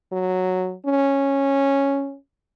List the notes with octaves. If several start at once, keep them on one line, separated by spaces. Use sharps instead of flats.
F#3
C#4